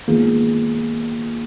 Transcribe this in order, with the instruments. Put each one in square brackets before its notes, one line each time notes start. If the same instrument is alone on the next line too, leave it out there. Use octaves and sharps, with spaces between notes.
[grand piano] D#3 G#3 B3 F4 G#4 [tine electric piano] A#3